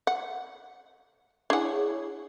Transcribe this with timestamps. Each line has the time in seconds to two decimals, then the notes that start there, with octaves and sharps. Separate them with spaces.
0.07 F#5
1.50 D4 E4 G#4 C#5 F#5